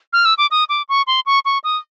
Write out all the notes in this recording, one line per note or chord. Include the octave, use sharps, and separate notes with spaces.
F6
E6
D6
D#6
D6
C#6
C6
C#6
C#6
D#6